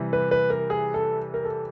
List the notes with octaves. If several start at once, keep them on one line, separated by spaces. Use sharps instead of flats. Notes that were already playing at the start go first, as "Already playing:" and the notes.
Already playing: C3 E3 G3
B4
B4
A#4
G#4
A4
A#4
A4